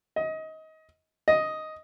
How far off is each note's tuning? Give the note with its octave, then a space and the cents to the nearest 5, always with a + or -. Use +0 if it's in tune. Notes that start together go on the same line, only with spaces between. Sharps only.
D#5 +25
D#5 +5